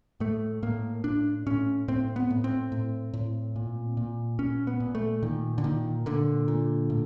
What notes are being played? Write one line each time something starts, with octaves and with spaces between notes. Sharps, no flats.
A2 A3
A2 A#3
A2 D4
A2 C#4
A2 C4
B3
A2
C4
A2
A2
A#2
A#2
A#2 C#4
B3
A#2
A3
A#2 D#3
D3
A#2 D#3
A#2 D3
A#2
A2